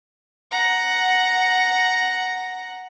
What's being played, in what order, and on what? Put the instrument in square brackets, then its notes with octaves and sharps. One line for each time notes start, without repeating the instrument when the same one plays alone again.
[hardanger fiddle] F#5 A#5